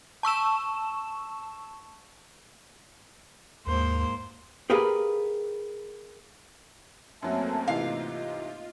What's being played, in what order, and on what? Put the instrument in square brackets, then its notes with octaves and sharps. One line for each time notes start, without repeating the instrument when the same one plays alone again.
[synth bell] A5 C#6 E6 E7
[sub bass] D#2 [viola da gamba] G#2 A#3 C5
[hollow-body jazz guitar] G4 G#4 A#4 B4 F5 G#5
[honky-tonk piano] F#2 F#3 [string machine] A3 A#3 C4 [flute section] C#5 E5 A5
[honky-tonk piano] G#2 C3 E3 [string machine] F4 [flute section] D#5 [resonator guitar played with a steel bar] F5